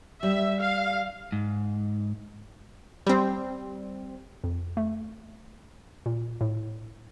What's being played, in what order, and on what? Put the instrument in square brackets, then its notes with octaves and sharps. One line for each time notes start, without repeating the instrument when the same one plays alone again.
[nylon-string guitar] G3 [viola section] E5
[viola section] F5
[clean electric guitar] G#2
[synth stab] G3 C4
[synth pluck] F2
A3
A#2
A2